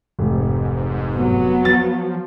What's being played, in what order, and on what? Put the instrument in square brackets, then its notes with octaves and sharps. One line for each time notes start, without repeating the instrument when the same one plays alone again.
[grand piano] F1 [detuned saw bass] G#2
[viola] F#3 B3
[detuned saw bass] F3 [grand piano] A6